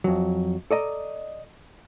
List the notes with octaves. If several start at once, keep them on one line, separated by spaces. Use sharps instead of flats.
F2 F#3
A4 D5 D#5 A#5